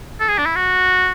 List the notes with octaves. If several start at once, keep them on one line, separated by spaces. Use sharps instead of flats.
A4
G#4
D4
E4
F#4